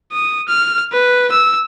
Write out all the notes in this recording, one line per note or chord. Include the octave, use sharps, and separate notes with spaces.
D#6
F6
B4
E6